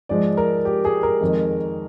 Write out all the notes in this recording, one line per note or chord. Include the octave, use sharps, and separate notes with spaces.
G#2 F3 G#3 D5
A#4
G4
G#4
A#4
F2 D#3 G#3